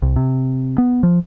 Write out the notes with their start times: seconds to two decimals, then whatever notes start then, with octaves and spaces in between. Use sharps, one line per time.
0.02 C2
0.16 C3
0.78 B3
1.03 F3